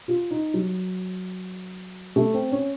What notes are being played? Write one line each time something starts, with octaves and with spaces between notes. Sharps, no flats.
F4
D#4
F#3
A3
C4
C#4